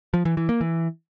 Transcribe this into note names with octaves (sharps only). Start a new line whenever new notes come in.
F3
E3
E3
A#3
E3